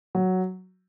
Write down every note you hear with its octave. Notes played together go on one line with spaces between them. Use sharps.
F#3